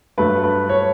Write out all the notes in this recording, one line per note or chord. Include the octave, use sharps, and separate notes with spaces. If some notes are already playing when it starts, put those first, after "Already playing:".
G2 F#3 A3 B4
B4
C#5